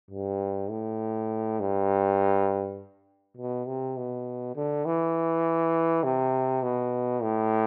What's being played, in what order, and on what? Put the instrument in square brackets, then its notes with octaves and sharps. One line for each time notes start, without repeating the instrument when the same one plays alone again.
[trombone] G2
A2
G2
B2
C3
B2
D3
E3
C3
B2
A2